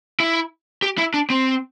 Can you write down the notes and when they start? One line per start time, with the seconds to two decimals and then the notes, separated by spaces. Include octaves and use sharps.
0.20 E4
0.82 G4
0.98 E4
1.14 D4
1.30 C4